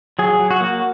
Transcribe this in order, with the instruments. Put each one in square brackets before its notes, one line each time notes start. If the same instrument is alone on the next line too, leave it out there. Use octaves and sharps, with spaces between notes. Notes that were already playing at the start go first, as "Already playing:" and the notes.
[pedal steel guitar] F#3 G#4
F#3
F#4
A#3